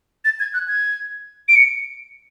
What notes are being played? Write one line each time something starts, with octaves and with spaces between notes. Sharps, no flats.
A6
G#6
F#6
G#6
D7
C#7